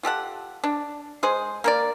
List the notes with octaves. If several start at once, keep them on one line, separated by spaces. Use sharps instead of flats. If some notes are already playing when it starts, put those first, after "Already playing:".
F4 G4 A4 F#5
D4
G#3 G#4 C5
A#3 A#4 D5